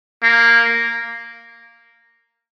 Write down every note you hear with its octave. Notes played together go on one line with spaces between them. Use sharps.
A#3